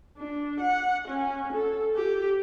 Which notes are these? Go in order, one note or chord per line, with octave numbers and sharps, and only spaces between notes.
D4
F#5
C#4
A4
G4